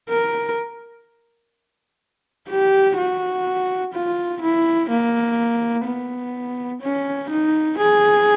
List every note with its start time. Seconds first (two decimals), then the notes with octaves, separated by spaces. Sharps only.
0.10 A#4
2.50 G4
2.98 F#4
3.93 F4
4.42 E4
4.90 A#3
5.86 B3
6.82 C#4
7.30 D#4
7.78 G#4